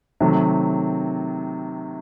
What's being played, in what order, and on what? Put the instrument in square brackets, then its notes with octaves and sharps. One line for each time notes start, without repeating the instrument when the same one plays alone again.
[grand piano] C3 D#3 F#3 A3